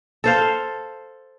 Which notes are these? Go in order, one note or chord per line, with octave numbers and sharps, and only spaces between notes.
A4 C5 F5